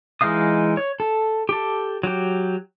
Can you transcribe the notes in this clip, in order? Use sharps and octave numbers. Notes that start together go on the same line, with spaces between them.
E3 G#3 D#4 F5 D#6
C#5
A4
G4 A4
F#3 G4